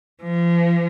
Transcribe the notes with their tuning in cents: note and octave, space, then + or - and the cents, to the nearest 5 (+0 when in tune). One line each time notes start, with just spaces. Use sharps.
F3 -35